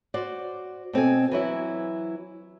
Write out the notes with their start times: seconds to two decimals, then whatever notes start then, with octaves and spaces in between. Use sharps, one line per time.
0.14 F#4 C5 D5
0.93 B2 C4 A4 G#5
1.32 E3 F#3 E4